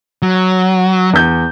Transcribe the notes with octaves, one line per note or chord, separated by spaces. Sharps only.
F#3
E2 G6